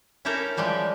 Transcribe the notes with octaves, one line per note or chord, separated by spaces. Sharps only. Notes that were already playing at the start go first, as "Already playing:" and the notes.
C#4 E4 G4 A4 A#4 G5
E3 F3 G3 G#3 G4